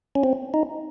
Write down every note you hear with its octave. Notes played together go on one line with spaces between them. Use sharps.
C#4
C4
D#4